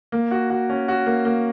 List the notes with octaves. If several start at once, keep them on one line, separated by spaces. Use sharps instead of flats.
A#3
F#4
F#4
C#4
F#4
A#3
A#3